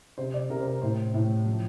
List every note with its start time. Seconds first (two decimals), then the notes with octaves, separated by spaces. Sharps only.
0.18 C3 C5
0.34 D5
0.50 C3 A#4
0.60 C5
0.67 A#4
0.82 A2 C5
1.14 A2
1.46 F3